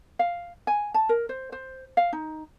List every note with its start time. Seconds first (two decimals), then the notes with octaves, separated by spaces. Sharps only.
0.19 F5
0.67 G#5
0.94 A5
1.09 A#4
1.29 C5
1.52 C5
1.97 F5
2.13 D#4